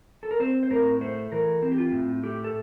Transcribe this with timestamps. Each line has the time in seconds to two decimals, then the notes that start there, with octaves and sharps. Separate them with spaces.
0.23 A4
0.31 A#4
0.40 C4 C5
0.63 C5
0.70 A2 A#4
1.01 A3 C5
1.32 E3 A#4
1.62 C4
1.72 G4
1.78 F4
1.92 A2
2.24 A3 G4
2.44 A4